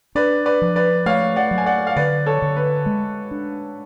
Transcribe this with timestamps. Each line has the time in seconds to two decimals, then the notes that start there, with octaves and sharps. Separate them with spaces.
0.15 D4 B4 D5
0.46 B4 D5
0.62 F3
0.76 B4 D5
1.06 A3 C#5 F5
1.36 D5 F#5
1.51 F#3
1.58 G#5
1.66 D5 F#5
1.87 F5
1.96 D3 B4 D5
2.26 A4 C#5
2.42 D3
2.57 B4
2.86 G#3
3.31 D4